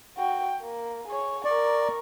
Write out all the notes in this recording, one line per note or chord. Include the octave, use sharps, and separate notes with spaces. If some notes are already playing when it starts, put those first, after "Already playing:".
F#4 G5
A#3
G#4 C#5
A#4 D5 C#6